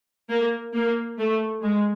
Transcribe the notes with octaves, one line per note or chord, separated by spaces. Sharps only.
A#3
A#3
A3
G#3